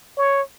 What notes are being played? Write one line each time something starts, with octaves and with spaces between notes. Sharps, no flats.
C#5